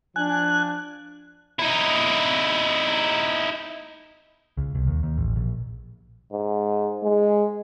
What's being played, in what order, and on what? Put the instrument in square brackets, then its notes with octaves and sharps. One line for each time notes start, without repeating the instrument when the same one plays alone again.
[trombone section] F3 D4 [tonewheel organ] G#5 F#6
[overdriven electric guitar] D#4 E4
[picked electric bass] C#2
C2
D#2
D#2
A1
A#1
[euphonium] G#2
G#3